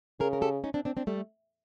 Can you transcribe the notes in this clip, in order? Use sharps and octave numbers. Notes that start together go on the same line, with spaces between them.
C#3 G#4 A#4
A#4
G4 A4
C#4 D#4
C4 D4
C4 D4
C4 D4
G3 A3